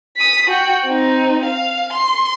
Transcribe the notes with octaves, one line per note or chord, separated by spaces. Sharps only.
D#6 B6
F#4 G5
C4 D#4
F5
C6